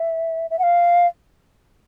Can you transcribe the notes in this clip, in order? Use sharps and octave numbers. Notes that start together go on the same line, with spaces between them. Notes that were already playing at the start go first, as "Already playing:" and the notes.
Already playing: E5
E5
F#5
F5